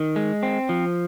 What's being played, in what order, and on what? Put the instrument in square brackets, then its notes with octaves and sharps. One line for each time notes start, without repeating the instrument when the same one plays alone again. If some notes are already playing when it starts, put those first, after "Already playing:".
Already playing: [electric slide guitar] D#3
G#3
C4
F3